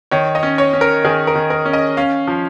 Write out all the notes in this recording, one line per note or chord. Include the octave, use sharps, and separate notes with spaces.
D#3 C#5
D#5
C#4
C#5
C#4
A#4
D#3 G#4
A#4
D#3
A#4
C#4
D#5
C#4 F5
F3